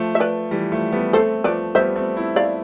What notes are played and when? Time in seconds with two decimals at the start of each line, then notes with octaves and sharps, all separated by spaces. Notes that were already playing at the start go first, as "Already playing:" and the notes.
Already playing: F3 A3
0.15 E5
0.20 B4 D5
0.51 E3 G3
0.72 F3 A3
0.92 G3 B3
1.13 A3 C4 A4 C5
1.44 F3 A3 B4 D5
1.75 G3 B3 C5 E5
1.96 A3 C4
2.16 C4 E4
2.36 D5 F5